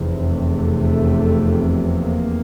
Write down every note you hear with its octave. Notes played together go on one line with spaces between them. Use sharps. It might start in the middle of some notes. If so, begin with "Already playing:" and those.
Already playing: F1 E2 C3
A3
A#3